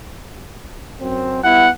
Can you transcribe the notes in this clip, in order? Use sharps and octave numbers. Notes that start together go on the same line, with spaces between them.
F#2 C4
G3 B3 E4 F#5